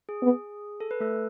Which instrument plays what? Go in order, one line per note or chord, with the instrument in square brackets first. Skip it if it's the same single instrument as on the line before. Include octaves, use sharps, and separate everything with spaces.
[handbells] G#4
[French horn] B3
[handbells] A4
B4
A3 A4